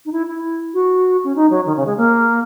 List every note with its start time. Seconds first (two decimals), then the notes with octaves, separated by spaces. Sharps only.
0.05 D#4
0.12 E4
0.27 E4
0.73 F#4
1.24 C#4
1.35 D#4
1.50 F#3
1.65 D#3
1.76 C#3
1.86 G#3
1.97 A#3